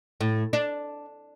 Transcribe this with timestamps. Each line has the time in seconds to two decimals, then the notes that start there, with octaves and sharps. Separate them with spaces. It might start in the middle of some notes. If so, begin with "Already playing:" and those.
0.21 A2
0.53 D4